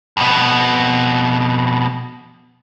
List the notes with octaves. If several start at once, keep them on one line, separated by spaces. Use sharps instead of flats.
F2 B2